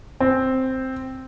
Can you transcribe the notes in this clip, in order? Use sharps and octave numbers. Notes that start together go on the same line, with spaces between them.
C4